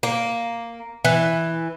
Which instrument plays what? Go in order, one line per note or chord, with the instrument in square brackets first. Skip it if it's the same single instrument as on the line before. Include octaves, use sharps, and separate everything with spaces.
[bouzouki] A#3
E3